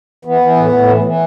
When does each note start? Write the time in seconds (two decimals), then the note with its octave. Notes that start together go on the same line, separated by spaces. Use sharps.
0.25 E3 B3
0.41 E3
0.56 A2
0.72 A2
0.88 E3
1.04 E3